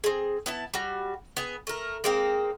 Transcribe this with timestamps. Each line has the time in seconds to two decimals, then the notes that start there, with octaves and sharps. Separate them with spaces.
0.04 C4 G#4
0.46 B3 E4 A5
0.74 G3 F#4
1.37 B3 G#4
1.67 A3 A#4
2.04 G#3 A#3 C4